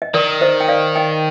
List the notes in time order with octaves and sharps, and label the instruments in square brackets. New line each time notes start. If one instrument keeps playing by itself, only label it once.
[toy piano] D#5
[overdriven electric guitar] D#3 [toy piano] A#4 D5
[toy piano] C5 D#5
G5
D5 F5
D#5 G5